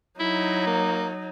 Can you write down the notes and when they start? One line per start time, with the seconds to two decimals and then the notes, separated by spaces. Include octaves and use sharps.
0.20 F#3 D#4 E4
0.67 A#3